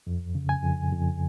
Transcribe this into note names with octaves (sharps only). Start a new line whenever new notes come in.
F2
C#3
G#5
F2
F2